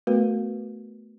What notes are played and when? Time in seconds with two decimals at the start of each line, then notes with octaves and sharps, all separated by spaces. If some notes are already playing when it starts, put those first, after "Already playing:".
0.07 A3 B3 F#4 A#4 B4